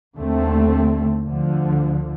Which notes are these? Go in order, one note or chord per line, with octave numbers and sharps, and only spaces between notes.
D#2 D3 A3 C4
D2 D3 F3